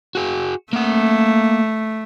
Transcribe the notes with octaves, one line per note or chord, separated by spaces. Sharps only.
F#4 G#4
A3 A#3 F#5